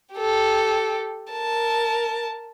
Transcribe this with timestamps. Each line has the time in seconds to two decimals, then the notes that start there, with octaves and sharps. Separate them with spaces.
0.15 G4 A4
1.33 A#4 A5